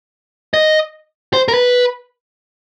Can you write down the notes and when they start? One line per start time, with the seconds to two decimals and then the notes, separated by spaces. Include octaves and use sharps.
0.54 D#5
1.33 C5
1.48 A#4
1.54 B4